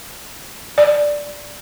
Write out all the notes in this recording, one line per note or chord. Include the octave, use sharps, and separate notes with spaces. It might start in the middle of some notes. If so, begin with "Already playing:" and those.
D5